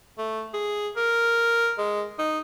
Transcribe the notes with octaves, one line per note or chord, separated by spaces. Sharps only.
A3
G#4
A#4
G#3
D#4